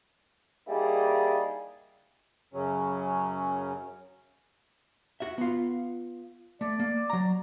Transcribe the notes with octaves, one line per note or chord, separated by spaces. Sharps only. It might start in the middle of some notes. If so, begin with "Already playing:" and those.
G3 A#3 D#4 E4 G#4
F#2 C#3 F#3 C#4
F#4 E5
B3 F4
A3 D5
A#3
F#3 A#5